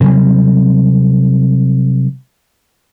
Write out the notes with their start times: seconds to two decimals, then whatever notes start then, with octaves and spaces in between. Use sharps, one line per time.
0.01 C3 F#3 G3 C4